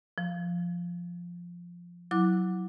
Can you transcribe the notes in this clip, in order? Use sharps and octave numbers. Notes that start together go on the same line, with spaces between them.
F3
F#3 E4 D6 F#6